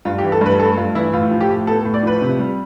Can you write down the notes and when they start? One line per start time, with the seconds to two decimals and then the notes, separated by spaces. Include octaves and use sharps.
0.05 G2 F4
0.18 G4
0.23 E3
0.32 A4
0.41 G2 B4
0.59 A3 A4
0.77 G2 F4
0.95 E3 E4
1.13 A2 F4
1.31 F3
1.41 G4
1.50 A2
1.67 B3 A4
1.85 A2
1.94 D5
2.03 F3 B4
2.21 C3
2.39 G3